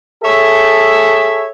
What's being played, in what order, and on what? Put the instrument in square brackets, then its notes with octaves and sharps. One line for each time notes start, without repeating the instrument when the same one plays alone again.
[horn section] G#4 A4 C#5 E5